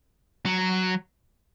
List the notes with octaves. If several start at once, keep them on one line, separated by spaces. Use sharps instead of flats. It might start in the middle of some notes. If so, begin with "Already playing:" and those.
F#3